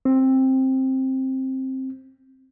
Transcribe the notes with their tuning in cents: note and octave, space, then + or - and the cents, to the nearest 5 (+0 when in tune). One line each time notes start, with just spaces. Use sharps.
C4 +10